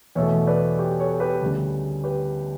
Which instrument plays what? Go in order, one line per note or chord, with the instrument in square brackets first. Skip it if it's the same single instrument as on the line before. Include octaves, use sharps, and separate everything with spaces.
[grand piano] E2 B2 A3 C#5 E5
B4 D5
G4
A4 C#5
G4 B4
D2 C#3 G3
G4 B4